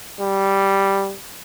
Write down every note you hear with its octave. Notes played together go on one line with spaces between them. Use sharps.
G3